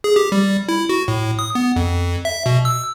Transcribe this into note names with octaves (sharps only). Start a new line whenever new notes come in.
G#4
G4
G3
E4
F#4
A2
D#6
B3
F2
E5
B2
E6